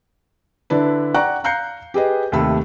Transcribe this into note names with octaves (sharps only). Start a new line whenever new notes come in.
D3 D4 E4 B4
D5 F#5 G5 A#5 C#6 F#6
F5 A#5 F#6 G6 C7 C#7
G4 G#4 B4 D#5
D#2 C3 A3 B5 E6